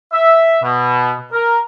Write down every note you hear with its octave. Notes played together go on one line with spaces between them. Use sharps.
E5
B2
A#4